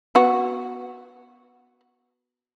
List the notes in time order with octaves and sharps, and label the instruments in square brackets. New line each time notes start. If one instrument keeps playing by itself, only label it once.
[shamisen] B3 F#4